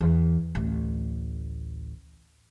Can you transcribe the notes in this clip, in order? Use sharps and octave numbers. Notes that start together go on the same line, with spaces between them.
E2
A1 D2